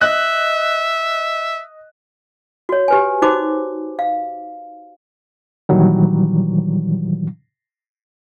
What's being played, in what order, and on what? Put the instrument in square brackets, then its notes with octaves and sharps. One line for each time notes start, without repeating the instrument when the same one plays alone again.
[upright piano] D#5 F#6 [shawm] E5
[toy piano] F#4 C#5
G4 B4 G#5
D#4 F#4 C5 D6
F5
[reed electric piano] A#2 D#3 E3 F#3 G3